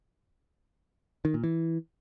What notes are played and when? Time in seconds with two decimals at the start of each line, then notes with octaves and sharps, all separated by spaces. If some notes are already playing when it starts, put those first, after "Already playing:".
1.25 D#3
1.34 A#2
1.44 E3